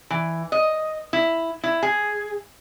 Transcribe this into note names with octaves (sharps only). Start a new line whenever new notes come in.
E3
D#5
E4
E4
G#4